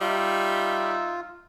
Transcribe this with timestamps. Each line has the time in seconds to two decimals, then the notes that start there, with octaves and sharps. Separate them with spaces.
0.01 G3 D#4 F4 E5